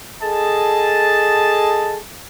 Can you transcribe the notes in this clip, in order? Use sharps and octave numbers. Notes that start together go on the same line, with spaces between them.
G#4 A4 D#5 A5